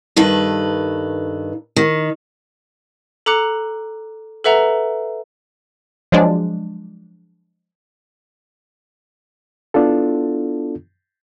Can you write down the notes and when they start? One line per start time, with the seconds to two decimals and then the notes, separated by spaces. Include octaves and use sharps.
0.16 G2 D#3 A4 B4
1.76 D#3
3.26 A4 A#5 D6 F#6 C#7
4.44 A4 B4 E5 F#5 A#5
6.12 F3 F#3 G#3 D4
9.74 B3 D4 E4 F4 A4